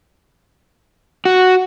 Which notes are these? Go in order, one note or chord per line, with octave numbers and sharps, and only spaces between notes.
F#4